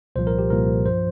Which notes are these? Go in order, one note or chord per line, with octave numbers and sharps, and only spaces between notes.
C2 A#2 F3 C5
A#4
G4
C2 A#2 F3 A#4
G2 F3 C5